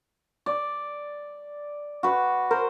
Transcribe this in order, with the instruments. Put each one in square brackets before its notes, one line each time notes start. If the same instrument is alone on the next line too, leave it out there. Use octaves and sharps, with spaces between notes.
[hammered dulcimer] D5
F#4 B4
[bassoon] A#4 [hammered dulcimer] C5